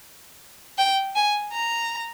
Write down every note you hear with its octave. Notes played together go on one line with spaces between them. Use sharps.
G5
G#5
A#5